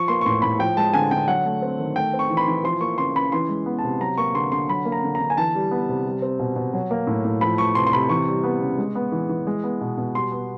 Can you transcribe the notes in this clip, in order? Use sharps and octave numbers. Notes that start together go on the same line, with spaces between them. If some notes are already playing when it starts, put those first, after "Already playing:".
Already playing: F3 C#6
A#3 C6
C#6
A2 C6
A2 B5
F3 G5
G#3 A5
D3 G#5
D3 G5
F#3 F#5
A3
C4
D#3
A3 G5
C4
C#6
E3
B5
C6
E3
F3 C6
A#3 C#6
C#3 C6
C#3 B5
E3 C6
G#3
B3
A5
C3
F#3 A#5
A#3 C#6
D3 C6
D3 C6
F#3 B5
A#3
A#5
D3
D3 A#5
G#5
E3 A5
G3
B3
C3
G3
C4
B2
B2
F#3
A#3
A2
A2
F3 B5
A3 C#6
C3 C6
C6
C3 B5
E3 C#6
G3
B3
C#3
G#3
B3
E3
E3
G#3
B3
B2
B2
G3 C6
B3